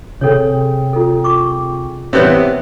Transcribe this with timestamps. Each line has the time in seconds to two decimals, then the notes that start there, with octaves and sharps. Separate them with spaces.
0.21 C3 G#4 A4 C#5 G5
0.93 F4 A4
1.24 C#6 D6
2.13 C3 E3 B3 C5 C#5